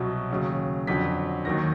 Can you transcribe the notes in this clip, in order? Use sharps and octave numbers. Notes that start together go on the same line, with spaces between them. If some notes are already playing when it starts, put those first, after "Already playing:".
Already playing: C2 B2 F#3
D#2 C#3 F#3
F2 D3 F#3 B6
D#2 D#3 F#3 A#6